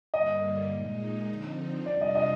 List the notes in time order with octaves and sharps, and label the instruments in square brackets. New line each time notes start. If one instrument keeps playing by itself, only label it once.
[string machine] G2 D3 G3 A#3 [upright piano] D#5
[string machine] A#2 G#3 D#4
D3 F3 C4 D#4
[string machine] F2 C3 G3 D4 F4 [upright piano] D5
[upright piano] D#5
D#5